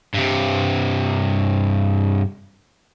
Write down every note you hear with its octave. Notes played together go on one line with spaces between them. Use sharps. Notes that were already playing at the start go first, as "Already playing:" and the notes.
G2 C3